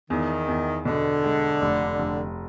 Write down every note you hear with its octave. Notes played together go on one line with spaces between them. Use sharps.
E2 D#3
E2
B2 D3
G#3
F1
F1